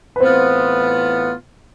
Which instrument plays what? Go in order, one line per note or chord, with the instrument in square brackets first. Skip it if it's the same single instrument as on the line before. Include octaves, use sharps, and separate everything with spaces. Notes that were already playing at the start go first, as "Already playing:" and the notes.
[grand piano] B4
[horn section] A2 E3 B3 F4 [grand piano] C4 C5